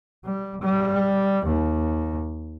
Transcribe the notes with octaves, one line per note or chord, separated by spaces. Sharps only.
G3
G3
D#2